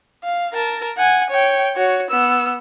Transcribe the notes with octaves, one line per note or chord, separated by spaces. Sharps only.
F5
A#4 A5
F#5 G#5
C#5 G5
F#4 C#5
B3 E6